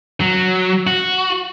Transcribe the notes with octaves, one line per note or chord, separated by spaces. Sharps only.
F#3
F#4